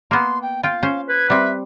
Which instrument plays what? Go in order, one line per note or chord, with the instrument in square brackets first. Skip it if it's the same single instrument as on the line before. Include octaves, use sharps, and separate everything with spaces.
[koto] A#3 B3 [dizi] C6
[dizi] G5
[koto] F4 G5 [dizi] F5
[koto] C#4 C5
[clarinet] B4 [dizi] G#6
[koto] G3 C4 [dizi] E5